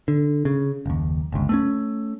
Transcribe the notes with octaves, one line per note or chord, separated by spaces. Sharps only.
D3
C#3
F#1 D#2
G1 C#2
A3 A#3 C#4